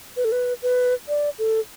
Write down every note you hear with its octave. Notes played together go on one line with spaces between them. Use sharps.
B4
A4
B4
B4
D5
A4